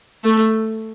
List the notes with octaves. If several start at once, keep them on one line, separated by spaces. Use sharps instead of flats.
A3